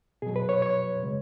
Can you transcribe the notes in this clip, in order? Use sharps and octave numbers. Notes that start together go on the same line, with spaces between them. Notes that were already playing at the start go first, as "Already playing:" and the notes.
B2 F#3 G#4
B4
C#5
C#5
C#3 G#3